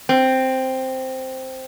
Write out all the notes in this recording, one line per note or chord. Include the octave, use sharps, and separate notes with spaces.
C4